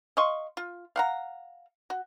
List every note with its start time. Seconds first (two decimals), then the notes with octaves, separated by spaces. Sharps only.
0.17 D#5 F5 C6 C#6
0.57 F4
0.96 F5 F#5 A#5
1.90 F#4